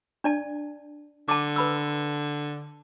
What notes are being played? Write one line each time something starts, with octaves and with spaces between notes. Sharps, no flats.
D4 D5 A5
D3 A5 D6
B4 B5 E6